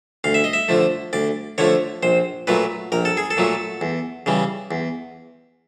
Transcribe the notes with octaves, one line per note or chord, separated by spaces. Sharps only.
D2 F5
E5
D#5
E5
D3 F3 A3
D2 D5
D3 F3 A3 C#5
A#1 C5
A#2 F#3 A3 B4
A#1 A#4
A4
G#4
A4
A#2 F#3 A3
E2
C#3 E3 G3
E2